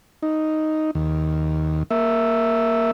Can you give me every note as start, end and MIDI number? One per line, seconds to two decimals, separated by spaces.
0.22 0.91 63
0.95 1.83 39
1.91 2.91 58
1.91 2.91 76